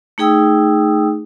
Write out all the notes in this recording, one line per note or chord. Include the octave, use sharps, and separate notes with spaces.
A3 D#4 G#4 G5 D#6 E6